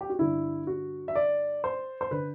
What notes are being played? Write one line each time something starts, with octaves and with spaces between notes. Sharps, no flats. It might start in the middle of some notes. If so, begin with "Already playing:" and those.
G4
F#4
G2 D3 E4
F#4
E5
D5
C5
C5
D3 B4